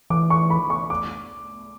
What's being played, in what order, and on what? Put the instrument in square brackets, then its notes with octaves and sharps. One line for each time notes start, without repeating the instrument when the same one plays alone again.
[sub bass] E3 [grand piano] D6
[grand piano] C#6
B5
C#6
D6